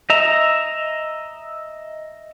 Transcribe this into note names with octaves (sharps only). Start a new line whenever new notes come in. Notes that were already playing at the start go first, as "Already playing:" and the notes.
D#5 E5 A#5